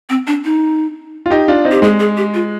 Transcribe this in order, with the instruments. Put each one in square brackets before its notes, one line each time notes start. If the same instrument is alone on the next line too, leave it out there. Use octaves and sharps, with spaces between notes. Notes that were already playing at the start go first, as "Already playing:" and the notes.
[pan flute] C4
D4
D#4
[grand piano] F4
D#4 G4
D4 F4
C4 D#4
[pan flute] G4
[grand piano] G#3 [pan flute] G#4
[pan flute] G#4
G4
F4